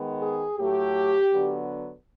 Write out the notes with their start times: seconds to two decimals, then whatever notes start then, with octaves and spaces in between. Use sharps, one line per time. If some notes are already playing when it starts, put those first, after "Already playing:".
Already playing: D#3 G#3 B3
0.22 G#4
0.59 A2 F#3 A3 G4
1.32 D3 F#3 B3